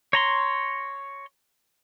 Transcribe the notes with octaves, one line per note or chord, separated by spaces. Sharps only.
C#5 A#5 C6